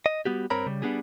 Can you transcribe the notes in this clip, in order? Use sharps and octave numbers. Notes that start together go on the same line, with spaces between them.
D#5
G3 B3 F#4 G4
G2 C4 A#4 C#5 A#5 B5
C#3 G3
G3 B3 D4 G4 G#4